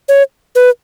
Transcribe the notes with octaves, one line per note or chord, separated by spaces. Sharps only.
C#5
B4